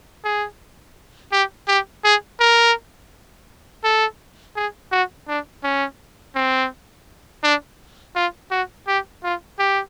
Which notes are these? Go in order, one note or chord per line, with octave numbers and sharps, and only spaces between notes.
G#4
G4
G4
G#4
A#4
A4
G#4
F#4
D4
C#4
C4
D4
F4
F#4
G4
F4
G4